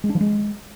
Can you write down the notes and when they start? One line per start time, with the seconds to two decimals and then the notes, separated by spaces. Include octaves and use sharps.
0.04 G#3
0.09 D4
0.15 F3
0.21 G#3